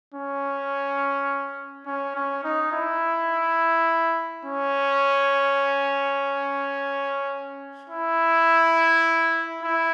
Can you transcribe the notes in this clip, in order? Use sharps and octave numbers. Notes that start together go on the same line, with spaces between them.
C#4
C#4
C#4
D#4
E4
C#4
E4
E4